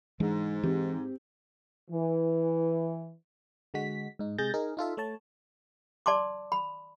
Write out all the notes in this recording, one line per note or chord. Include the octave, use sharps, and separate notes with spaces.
G#2 E3 G#3 D4
E3 C4 G4
E3
D3 G#3 F#4 B6
G#2 D#4
C3 G#3 G#4 G6 A6 A#6
D#4 G#4 A#4
D#4 F4 A4 E5
A3 C#5 A5
D5 A5 C6 D6
B5